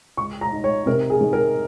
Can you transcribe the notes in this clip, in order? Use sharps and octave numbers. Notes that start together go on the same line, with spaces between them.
C#2 C#6
A#5
D#4
C#5
C3 A#4
G#4
D#3
A#4